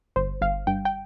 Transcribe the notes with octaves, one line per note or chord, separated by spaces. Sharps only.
G1 C5
G1 F5
G2 G5
G5